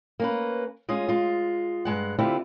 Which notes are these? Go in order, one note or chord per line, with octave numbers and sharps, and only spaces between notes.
A#3 C#4 B4
G#3 C#4 F4 G#4
G#3 F4
G2 G#3 F#5
D3 A3 C4 E4 F4 G4